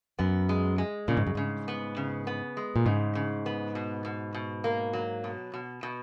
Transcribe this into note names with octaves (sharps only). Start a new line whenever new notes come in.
F#2 B3
G#3
G#3
A#2 C#3
G#2
F#2
G#2 C#3
B3
C#3
B3
G#3
A#2
G#2 C#3
C#3
B3
B2
B2
B2
A#3
F#3
B2
B2
B2